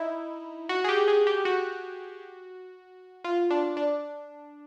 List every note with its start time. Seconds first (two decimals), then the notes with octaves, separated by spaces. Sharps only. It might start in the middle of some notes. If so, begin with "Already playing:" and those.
Already playing: D#4 E4
0.69 F#4
0.84 G#4
0.89 G4
1.08 G#4
1.27 G4
1.45 F#4
3.24 F4
3.50 D4
3.77 D4